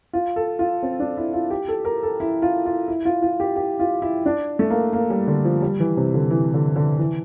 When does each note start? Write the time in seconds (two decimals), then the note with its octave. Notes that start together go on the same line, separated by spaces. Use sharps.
0.13 F4
0.36 A4
0.59 F4
0.83 C4
1.00 D4
1.17 E4
1.33 F4
1.50 G4
1.68 A4
1.85 A#4
2.03 A4
2.20 E4
2.42 F4
2.66 F4
2.88 E4
3.05 F4
3.22 F4
3.40 G4
3.56 G4
3.80 F4
4.02 E4
4.26 D4
4.59 A3
4.70 A#3
4.93 A#3
5.10 G3
5.27 D3
5.45 F3
5.62 G3
5.80 E3
5.97 C3
6.14 D3
6.30 E3
6.54 D3
6.76 D3
6.99 E3